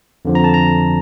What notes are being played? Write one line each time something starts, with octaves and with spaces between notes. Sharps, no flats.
F2 D3 F3
A#5
A5
A#5